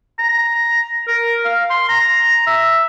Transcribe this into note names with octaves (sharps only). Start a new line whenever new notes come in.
A#5
A#4
F5
C6
A#5
E5